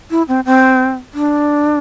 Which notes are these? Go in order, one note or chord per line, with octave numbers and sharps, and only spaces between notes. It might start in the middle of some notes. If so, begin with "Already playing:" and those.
E4
C4
C4
D4